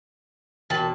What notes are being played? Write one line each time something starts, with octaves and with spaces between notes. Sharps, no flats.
E1 A#2 G5 A5 F#7